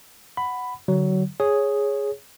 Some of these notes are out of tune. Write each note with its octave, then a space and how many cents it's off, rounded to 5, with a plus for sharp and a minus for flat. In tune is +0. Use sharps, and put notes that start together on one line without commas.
F#5 +0 B5 +10
D3 -5 F#3 +20
G#4 +0 C#5 +0